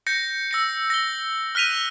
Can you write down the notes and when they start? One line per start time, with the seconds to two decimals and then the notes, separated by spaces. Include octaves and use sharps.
0.07 G6 A#6 C#7
0.51 E6 A#6 C#7
0.90 A#6 G7
1.55 F6 F#6 B6 D#7 F7